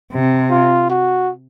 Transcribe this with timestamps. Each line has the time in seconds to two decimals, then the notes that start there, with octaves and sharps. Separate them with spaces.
0.12 C3
0.51 F4
0.90 F#4